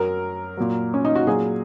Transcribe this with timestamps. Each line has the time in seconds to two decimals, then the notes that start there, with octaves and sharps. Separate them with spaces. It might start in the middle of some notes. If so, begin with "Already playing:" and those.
Already playing: F#2 F#3 A#4
0.57 A#2 F#3
0.94 C#4
1.05 D#4
1.15 F#4
1.27 A#2 F#3 G#4